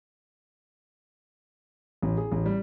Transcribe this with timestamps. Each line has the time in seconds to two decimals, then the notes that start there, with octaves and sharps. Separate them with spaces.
2.02 A1
2.17 G#4
2.32 A1
2.46 G3